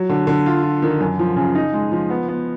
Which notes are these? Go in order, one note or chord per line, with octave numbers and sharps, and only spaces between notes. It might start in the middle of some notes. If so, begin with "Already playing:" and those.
Already playing: F#3
D3
D3
F4
F4
D#3
F#2
F3
C#3
D#4
G#3
F3
B3
B3